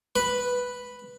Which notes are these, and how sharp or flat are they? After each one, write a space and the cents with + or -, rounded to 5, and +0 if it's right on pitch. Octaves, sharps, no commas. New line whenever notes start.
B4 +0 B5 +0